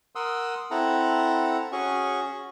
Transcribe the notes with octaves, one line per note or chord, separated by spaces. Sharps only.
A#4 F#5 C6 D#6 E6
C4 E4 A4 F#5 A#5
C#4 F#4 G#4 C#6